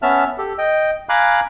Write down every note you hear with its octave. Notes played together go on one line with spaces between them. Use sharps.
B3 C#4 E5 A5 F6
G4 A4
D#5 G5
F5 G#5 A#5 B5 D6 F#6